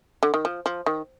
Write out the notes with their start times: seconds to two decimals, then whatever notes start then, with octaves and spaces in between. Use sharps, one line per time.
0.23 D3
0.34 D#3
0.45 F3
0.66 F3
0.86 D#3